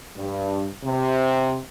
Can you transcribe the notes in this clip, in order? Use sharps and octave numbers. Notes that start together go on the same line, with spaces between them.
G2
C3